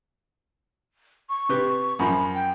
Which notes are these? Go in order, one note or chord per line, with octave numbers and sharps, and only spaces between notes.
C#6
C3 G4 B4
F#2 F3 B5
G5